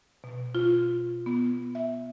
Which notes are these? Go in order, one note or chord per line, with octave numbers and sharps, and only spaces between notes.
B2
F4
B3
E5